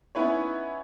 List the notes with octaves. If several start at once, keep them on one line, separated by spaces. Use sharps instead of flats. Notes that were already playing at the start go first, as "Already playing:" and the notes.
B3 C#4 D#4 E4 B4 C#5